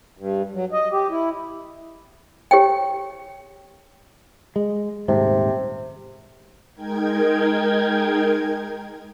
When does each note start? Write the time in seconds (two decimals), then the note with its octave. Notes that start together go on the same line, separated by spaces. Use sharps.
0.17 G2
0.54 F#3
0.72 D#5
0.91 G4
1.10 E4
2.51 G4 C#5 G5
4.56 G#3
5.08 D#1 G#2 C3 A3
6.75 G#3 D#4 A#4 G5 G#6